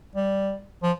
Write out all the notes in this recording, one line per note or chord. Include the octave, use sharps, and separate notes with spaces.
G3
F3